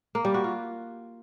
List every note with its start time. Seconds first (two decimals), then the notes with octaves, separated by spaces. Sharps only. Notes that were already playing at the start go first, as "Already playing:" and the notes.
0.15 A#3
0.25 G3
0.34 F#4
0.44 F4